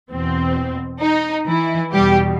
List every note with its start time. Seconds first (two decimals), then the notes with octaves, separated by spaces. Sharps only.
0.11 E2 B2 C4
1.01 D#4
1.47 E3 E4
1.92 E2 B2 G3 G4